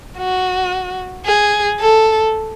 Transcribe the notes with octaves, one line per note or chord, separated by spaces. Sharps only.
F#4
G#4
A4